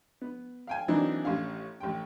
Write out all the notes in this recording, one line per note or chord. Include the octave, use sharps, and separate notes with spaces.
B3
F5 G5 G#5
E3 F#3 A#3 C4 D4 D#4
A1 C#4 F5
A1 G5